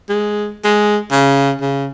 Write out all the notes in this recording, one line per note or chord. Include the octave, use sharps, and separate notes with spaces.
G#3
G#3
C#3
C#3